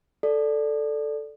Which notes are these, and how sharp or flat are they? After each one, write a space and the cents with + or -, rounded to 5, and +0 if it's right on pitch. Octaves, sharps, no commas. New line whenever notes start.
A4 +0 D5 +0